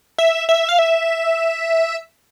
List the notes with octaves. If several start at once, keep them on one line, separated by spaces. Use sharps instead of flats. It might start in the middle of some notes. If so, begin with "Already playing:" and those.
E5
E5
F5
E5